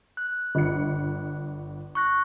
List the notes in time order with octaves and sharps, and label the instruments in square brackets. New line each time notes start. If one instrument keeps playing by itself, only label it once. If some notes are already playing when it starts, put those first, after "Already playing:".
[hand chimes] F#6
[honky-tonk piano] G1 C#7
[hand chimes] C#6 F#6 A#6